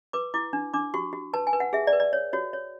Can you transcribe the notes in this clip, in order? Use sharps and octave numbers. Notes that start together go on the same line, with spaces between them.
B4 D6
E4 D6
D4
D4 D6
F#4 C#6
F#4
B4 A5
G#5
B4
F#5
G#4 E5
D5
B4
D5
C#5
F#4 C#5
C#5